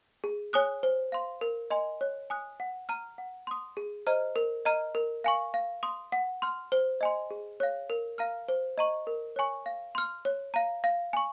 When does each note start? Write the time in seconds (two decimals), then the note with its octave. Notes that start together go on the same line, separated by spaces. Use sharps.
0.24 G#4
0.53 C#5 G#5 D#6 F#6
0.83 C5
1.12 F5 C6
1.41 A#4
1.70 D#5 G#5 C6
2.01 C#5
2.30 G#5 D#6 F#6
2.60 F#5
2.89 A#5 F6
3.18 F#5
3.47 C6 D#6
3.77 G#4
4.07 C5 D#5 A#5 F6
4.36 A#4
4.65 D#5 A#5 F6
4.95 A#4
5.24 F5 G#5 C#6
5.54 F5
5.83 C6 D#6
6.12 F#5
6.42 C6 F6
6.72 C5
7.01 D#5 G#5 C6
7.31 G#4
7.60 C#5 F5
7.90 A#4
8.18 F5 A#5 F6
8.48 C5
8.78 D#5 A#5 C#6
9.07 A#4
9.36 C#5 G#5 C#6
9.66 F5
9.95 C6 F6
10.25 C#5
10.54 F5 A#5
10.84 F5
11.13 G#5 C#6